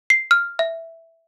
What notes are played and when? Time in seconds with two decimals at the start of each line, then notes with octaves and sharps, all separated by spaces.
0.10 C7
0.31 F6
0.59 E5